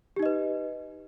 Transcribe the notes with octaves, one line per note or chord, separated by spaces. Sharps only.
D#4 G4 B4 D#5